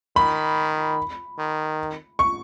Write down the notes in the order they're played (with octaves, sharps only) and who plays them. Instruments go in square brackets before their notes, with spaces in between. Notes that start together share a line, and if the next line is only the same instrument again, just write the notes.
[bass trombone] D#3 [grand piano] B5
[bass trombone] D#3
[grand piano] C#6